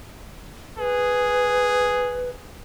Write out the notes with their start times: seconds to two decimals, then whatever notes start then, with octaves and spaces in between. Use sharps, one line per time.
0.79 G#4 B4